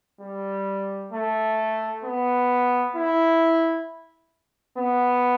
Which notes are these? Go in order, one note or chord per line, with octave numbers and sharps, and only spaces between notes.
G3
A3
B3
E4
B3